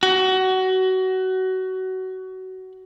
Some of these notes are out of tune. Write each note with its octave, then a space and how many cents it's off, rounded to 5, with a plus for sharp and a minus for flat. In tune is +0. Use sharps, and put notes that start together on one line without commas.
F#4 +20